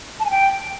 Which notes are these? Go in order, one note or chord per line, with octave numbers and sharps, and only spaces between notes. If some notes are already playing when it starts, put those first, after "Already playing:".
A5
G#5
G5